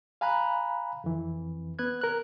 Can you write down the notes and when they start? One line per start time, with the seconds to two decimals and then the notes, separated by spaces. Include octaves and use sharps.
0.21 F5 G#5 A#5 B5 F#6
1.04 F2 E3
1.79 B3 B4 F#6 G#6
2.01 A#4 F#6